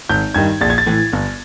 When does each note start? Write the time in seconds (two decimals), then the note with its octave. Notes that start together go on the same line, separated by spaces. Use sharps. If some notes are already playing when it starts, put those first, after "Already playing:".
0.09 G#1 G6
0.34 G2 D#3 G#6
0.61 A#1 A6
0.70 G#6
0.78 A6
0.87 A2 E3
1.13 G1